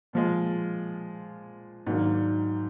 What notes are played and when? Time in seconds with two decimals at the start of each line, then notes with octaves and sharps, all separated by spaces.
0.13 A#2 F3 G#3
1.87 G#2 D#3 F#3 A#3 D4